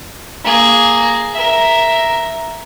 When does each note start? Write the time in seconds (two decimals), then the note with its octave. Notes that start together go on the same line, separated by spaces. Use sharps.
0.44 A#3 G#4
1.34 A#4 E5